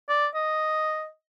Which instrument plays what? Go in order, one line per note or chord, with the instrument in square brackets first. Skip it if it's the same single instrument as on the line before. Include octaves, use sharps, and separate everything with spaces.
[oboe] D5
D#5